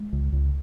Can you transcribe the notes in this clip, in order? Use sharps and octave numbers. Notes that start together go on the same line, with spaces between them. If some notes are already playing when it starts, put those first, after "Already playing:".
Already playing: G#3
C#2
C#2